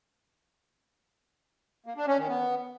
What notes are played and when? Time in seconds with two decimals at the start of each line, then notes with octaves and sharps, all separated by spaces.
1.86 A#3
1.97 D4
2.07 C#4
2.18 D#3
2.28 B3